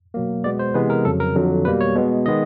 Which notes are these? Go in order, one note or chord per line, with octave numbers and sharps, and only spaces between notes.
B2 F#3 A#3
B2 G#3 B3 D5
C5
C3 E3 G#3 B3 B4
A#4
F2 C#3 F#3 A4
A#4
F2 D3 F#3
B2 G3 A#3 B4
C#5
B2 G#3 B3
D#3 G#3 B3 D#5